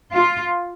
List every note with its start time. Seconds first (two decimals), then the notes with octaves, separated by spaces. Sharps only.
0.13 F4